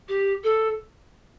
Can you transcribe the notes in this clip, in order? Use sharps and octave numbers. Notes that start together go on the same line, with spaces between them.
G4
A4